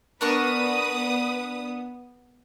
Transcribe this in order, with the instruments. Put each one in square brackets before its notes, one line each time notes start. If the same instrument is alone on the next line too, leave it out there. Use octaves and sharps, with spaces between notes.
[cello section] B3 [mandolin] D4 A#4 C#6 [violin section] B4 D#6